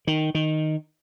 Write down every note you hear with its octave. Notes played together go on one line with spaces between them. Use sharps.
D#3
D#3